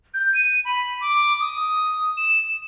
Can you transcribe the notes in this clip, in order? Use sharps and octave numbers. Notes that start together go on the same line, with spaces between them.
G6
D#7
B5
D6
D#6
E7